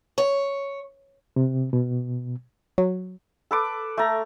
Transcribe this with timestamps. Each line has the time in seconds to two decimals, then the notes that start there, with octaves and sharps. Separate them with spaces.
0.18 C#5
1.36 C3
1.73 B2
2.78 F#3
3.51 A4 B4 D6
3.97 A3 A#5